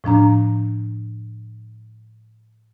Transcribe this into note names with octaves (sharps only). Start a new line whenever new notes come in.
A2 F3 D4 A#5